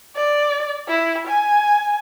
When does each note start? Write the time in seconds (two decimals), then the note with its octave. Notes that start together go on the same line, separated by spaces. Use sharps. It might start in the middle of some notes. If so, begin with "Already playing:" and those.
0.16 D5
0.88 E4
1.28 G#5